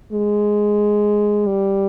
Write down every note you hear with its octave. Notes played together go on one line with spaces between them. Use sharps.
G#3
G3